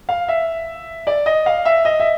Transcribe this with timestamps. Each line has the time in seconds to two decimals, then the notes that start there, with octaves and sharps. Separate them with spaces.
0.09 F5
0.28 E5
1.07 D5
1.26 D#5
1.46 F5
1.65 E5
1.85 D#5
2.00 E5